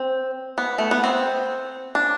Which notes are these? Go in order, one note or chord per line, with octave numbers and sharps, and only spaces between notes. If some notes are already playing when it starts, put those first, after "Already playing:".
Already playing: C4
B3
A3
B3
C4
D4